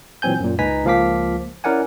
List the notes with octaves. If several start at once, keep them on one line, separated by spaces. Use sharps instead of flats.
A#2 E3 F#3 C4 G#5 G6
F#2 A#2
C#2 D#4 B4 G#5 A#5 B6
C#2 F3 A#3 F5 D6 B6
C#4 E4 A#4 D5 F#5 G#5